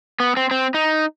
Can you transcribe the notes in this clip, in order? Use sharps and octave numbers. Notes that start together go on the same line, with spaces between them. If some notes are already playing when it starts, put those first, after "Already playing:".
B3
C4
C4
D#4